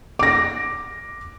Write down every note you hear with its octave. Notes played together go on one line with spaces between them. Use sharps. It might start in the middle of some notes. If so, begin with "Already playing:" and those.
D6 A#6